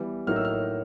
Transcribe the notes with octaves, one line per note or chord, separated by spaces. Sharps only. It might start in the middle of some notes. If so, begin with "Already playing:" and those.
Already playing: E3 G3 B3
A2 F#3 A#3 D#4 F6
E6
F6